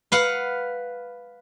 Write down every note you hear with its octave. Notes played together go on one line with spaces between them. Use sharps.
B4 F5 F#5